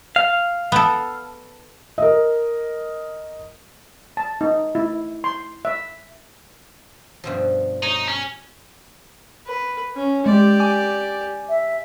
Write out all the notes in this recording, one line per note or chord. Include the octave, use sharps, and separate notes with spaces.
F5
B3 A4
A#4 D#5
A5
D#4
E4
C6
E5
G2 B2 F3
D#4 C#5
C#4
B4
C#4
G#3 G4 D5
G#5 D6
E5